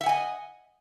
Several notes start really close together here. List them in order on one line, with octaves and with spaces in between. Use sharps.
E5 F#5 G#5 D#5